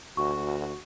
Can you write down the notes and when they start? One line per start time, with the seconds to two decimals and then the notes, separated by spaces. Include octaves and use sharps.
0.17 D2 F#4 C#6